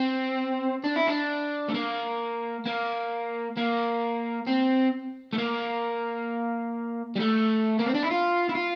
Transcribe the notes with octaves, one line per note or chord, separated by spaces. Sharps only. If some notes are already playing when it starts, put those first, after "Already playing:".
Already playing: C4
D4
E4
D4
A3
A#3
A#3
A#3
C4
A3
A#3
G3
A3
A#3
C4
D4
E4
F4
E4
F4